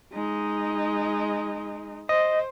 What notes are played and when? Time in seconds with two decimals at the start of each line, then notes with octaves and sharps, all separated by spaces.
0.13 G#3 D#4
2.09 C5 D#5